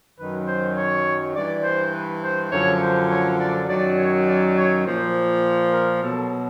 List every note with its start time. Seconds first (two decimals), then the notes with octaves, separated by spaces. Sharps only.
0.18 F#2 D#3 F#3 B4
0.47 C5
0.76 C#5
1.34 G2 E3 D5
1.64 C5
1.93 B4
2.22 C5
2.51 F#2 D3 F3 C#5
2.81 C5
3.10 C#5
3.39 D5
3.67 F#2 D#3 F#3 D5
3.97 C#5
4.26 D5
4.55 C#5
4.85 A#2 F3 C5
5.73 A#4
6.01 B2 F#3 A4